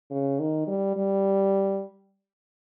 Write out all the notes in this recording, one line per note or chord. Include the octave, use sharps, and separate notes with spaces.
C#3
D#3
G3
G3